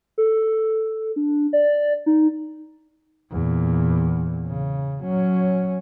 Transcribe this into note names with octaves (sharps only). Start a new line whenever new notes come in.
A4
D4
D5
D#4
E2 A#2
C#3
F#3 C#4